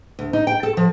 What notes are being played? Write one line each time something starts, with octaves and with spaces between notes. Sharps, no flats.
D2
D#4
G5
A4
F3